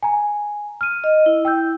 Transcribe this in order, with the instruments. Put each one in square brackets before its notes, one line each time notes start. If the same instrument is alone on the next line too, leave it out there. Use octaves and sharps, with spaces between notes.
[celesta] G#5 A#5
F6 D#7
[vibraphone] D#5
E4
[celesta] G5 E6 G6